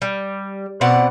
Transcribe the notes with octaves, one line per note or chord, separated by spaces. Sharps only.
G3
B2 C4 D5 F#5